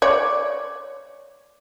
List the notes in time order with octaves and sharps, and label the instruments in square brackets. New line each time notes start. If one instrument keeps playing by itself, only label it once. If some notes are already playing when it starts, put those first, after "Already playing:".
[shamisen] C#5 D5